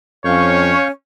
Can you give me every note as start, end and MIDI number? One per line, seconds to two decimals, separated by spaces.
0.25 0.74 41
0.25 0.90 61
0.25 0.92 73
0.25 0.88 77
0.25 0.88 85
0.25 0.88 91